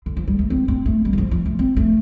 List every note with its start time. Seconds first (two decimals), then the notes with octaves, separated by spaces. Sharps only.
0.06 D3
0.17 F3
0.28 G3
0.39 A3
0.50 C4
0.68 C4
0.86 A3
1.05 G3
1.13 D3
1.18 F3
1.31 F3
1.46 A3
1.59 C4
1.77 A3